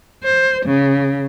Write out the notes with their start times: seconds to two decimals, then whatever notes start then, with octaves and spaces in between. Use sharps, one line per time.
0.23 C5
0.66 C#3